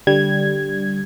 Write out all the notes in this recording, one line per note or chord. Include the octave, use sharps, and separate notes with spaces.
D3 G3 G#6